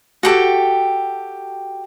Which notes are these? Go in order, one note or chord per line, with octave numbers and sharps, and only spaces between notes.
F#4 G4 A4